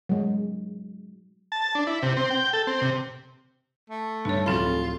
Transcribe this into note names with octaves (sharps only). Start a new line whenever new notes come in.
F#3 G#3
A5
D4
E4
C3
C4
G5
A4
C4
C3
A3
G2 D#4 C#5
D1 F2 F#3 C4 F4 A4 B5